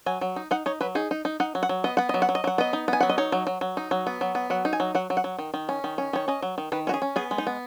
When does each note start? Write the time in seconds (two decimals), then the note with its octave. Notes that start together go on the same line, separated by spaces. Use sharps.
0.06 F#3 G#5
0.21 F#3
0.36 D#4
0.51 D#4 F#5
0.66 D#4 C#5
0.81 F#3 B4
0.95 D#4 G#4
1.11 D#4
1.25 D#4
1.40 D#4 F#5
1.55 F#3
1.63 F#5
1.69 F#3
1.84 B3 D#5
1.97 B3 F#5
2.09 F#3 D#5
2.22 F#5
2.29 F#3
2.35 D#5
2.44 F#3 F#5
2.58 B3 D#5
2.73 D#4
2.88 B3 G#5
3.01 F#3 F#5
3.09 D#5
3.18 D#4 C#5
3.32 F#3
3.47 F#3
3.61 F#3
3.77 D#4
3.91 F#3
4.07 B3
4.21 F#3
4.35 B3
4.50 F#3 F#5
4.65 D#4
4.73 G#5
4.80 F#3
4.95 F#3 F#5
5.10 F#3
5.17 F#5
5.24 F#3
5.39 D#3
5.54 D#3
5.69 C#4
5.84 D#3
5.98 C#4
6.13 D#3 C#5
6.28 C#4 D#5
6.42 F#3
6.58 D#3
6.72 D#3 B4
6.87 C#4 F#4
6.94 G#4
7.02 C#4
7.16 B3 G#4
7.31 G#3
7.38 D#4
7.47 B3